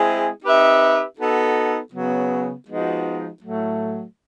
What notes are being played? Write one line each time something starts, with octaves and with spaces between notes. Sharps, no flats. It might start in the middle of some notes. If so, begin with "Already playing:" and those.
Already playing: G#3 C4 E4 G#4
C4 D#4 G4 B4 E5
B3 D#4 F#4 A4
C#3 F#3 B3
F3 G#3 B3 D#4 F#4
A2 F#3 A3